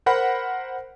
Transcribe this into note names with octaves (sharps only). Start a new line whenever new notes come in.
A#4 C5 F#5 B5